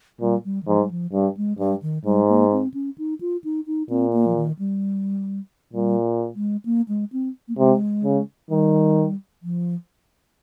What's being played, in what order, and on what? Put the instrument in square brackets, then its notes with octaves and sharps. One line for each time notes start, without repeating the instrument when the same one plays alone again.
[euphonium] A#2 [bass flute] G3
[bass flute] G3
D#3
[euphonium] G#2 [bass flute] F3
[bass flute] G3
F3
[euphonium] G2 [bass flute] G3
[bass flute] G#3
[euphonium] G2 [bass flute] G3
[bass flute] D#3
[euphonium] G#2 [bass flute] G3
[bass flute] A#3
C4
C#4
D#4
F4
D#4
D#4
[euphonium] A#2 [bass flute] C4
[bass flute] A#3
F3
D#3
G3
[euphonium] A#2 [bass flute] G3
[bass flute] G#3
A#3
G#3
C4
A#3
[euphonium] C3 [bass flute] G#3
[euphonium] C#3
[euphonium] D#3 [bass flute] G3
[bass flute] F3